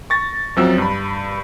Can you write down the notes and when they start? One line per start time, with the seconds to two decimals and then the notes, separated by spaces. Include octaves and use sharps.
0.10 C#6 A6 A#6
0.56 F#2 F3 F#3 C4 E6
0.78 G2 B5